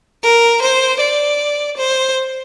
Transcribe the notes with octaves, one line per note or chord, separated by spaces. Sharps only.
A#4
C5
D5
C5